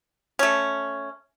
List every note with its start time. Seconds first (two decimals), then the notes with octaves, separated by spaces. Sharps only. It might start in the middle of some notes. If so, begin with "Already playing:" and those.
0.39 A3 C#4